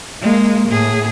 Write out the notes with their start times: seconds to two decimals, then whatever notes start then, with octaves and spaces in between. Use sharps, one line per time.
0.22 G#3 A#3
0.69 A2 G#4